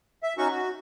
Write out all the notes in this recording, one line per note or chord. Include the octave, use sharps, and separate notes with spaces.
E5
C#4 D#4 F#4 C#6
F#4